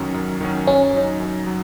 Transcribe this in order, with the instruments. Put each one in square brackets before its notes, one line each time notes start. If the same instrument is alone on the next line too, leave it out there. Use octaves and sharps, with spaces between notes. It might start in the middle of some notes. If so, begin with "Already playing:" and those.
Already playing: [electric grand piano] F#2 D#3 F#3 C#4
F#2
D#3 F#3 C#4
[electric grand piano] F#2 [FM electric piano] C#4
[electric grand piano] F#3 D#4
F#2
F#3